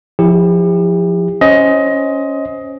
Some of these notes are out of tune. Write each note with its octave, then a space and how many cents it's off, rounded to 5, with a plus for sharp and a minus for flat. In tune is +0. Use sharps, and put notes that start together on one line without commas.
F3 +0 E4 +0 G4 +40
C#4 +0 C5 +0 D#5 +20